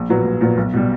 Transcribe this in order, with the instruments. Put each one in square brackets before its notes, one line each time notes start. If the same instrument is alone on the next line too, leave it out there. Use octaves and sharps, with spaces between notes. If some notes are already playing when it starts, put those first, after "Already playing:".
Already playing: [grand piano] A#1
A#2 F#3 B3
A#1
A#2 F#3 B3
B1
B2 G3